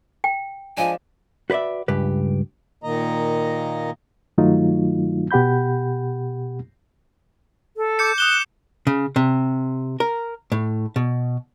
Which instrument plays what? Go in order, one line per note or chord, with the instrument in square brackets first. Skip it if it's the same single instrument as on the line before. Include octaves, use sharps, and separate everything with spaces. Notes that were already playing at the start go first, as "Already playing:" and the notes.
[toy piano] G5
[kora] F3 G#3 D4 [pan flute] G#5
[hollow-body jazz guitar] F#4 B4 C5 D5 E5
C#2 G2 G4 B4
[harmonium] A#2 D#3 A#3 D#5 A#5
[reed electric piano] G2 D#3 F#3 A3 D#4 F4
B2 G4 F#5 B5 G6
[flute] A4
[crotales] D6 G6 C#7
[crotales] D#6 E7 G7 [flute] F#6
[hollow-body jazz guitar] C#3
C3
A#4
A2
B2